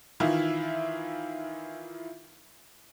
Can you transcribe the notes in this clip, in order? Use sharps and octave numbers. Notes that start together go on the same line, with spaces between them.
D#3 E3 E4 F4